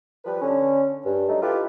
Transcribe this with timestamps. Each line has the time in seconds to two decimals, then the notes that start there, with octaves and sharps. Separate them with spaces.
0.24 F3 G3 B4
0.41 D3 C#4
1.05 G2
1.28 F#3 A3 D#4
1.42 E4 F4 G4 A4 B4